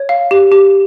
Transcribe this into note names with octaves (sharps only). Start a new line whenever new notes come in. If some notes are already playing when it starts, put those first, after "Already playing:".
Already playing: C#5
F5
G4
G4